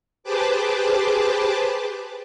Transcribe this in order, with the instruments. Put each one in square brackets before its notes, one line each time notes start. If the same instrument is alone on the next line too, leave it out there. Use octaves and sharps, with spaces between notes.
[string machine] G4 G#4 B4 C5 A5 D6